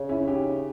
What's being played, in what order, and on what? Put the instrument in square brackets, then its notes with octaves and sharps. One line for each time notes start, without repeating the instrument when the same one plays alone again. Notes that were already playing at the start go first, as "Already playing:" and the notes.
Already playing: [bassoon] C#3
[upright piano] C#4 E4
D#4 G4